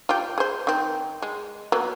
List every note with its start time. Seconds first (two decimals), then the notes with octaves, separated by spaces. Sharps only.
0.09 F4 G4
0.38 G#4 C5
0.67 D#3 C4
1.22 G#3
1.72 F#3 A#3 B3